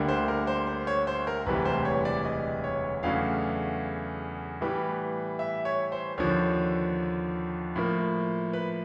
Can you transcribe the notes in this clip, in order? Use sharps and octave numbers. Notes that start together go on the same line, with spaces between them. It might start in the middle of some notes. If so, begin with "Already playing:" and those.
Already playing: D2 D3 G3 A#3
C5
A#4
C5
C5
C#5
C5
A#4
E1 D2 C3 E3 G3 B4
C5
C#5
D5
D#5
C#5
E2 C#3 F#3 A3 D4 F5
A2 E3 G3 B3
E5
C#5
C5
D#2 D3 F3 C#5
A2 F3 A#3
B4